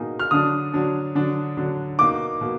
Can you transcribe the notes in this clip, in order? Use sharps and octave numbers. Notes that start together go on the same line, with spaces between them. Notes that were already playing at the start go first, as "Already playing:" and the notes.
Already playing: B2 A#3 D#4 G#4
F6
D3 F#3 D4 D#6
D3 F#3 D4
D3 F#3 D4
D3 F#3 D4
B2 A#3 D#4 D6
B2 A#3